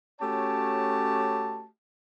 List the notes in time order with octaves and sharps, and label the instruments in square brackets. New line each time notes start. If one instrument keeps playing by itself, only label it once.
[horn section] A3 C#4 F#4 G4 C#5 A5